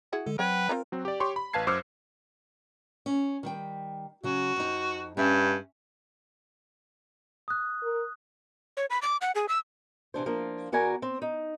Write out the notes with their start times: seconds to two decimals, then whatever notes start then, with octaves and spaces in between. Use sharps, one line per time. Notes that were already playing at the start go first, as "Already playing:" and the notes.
0.13 E4 F#4 G#4
0.26 D3 G#3 A4
0.39 F#3 C4 B4 C#5 F#5 G5
0.69 C4 F4 A#4 A#5
0.92 F#3 C4
1.05 G4 D5
1.20 G4 C#5 C6 C#6
1.36 B5
1.53 A1 B4 F5 A5 G#6 C7
1.67 F#2 C5 D6 E6 F6 C#7
3.06 C#4
3.43 D#3 G3 G5
4.23 C#3 F#3 F#4
4.56 F2 D#4
5.17 G2 C#4 E5
7.48 D#6 F#6
7.83 A#4
8.77 C#5
8.90 B5
9.02 D6
9.21 F#5
9.35 G#4
9.49 E6
10.14 C3 E3 D4 C5
10.26 F3 A#3 D4
10.72 E2 F#4 A#4 D5 G#5 A#5
11.02 C4
11.22 D#4